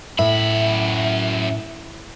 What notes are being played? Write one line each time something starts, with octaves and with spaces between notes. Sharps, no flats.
F#2 A2 E5 B5